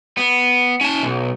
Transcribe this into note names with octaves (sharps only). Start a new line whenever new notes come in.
B3
C#4 A5
B1